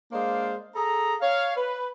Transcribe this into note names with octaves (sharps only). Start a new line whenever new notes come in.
G#3 A#3 D4 C5 F5
G#4 A4 A#5
C#5 F5
B4